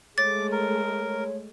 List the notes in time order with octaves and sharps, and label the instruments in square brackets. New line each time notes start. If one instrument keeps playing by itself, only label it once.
[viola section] G#3 A3 [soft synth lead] C#5 [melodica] D6 [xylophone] A6
[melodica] A#4